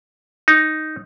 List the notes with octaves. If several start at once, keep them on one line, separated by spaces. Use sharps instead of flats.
D#4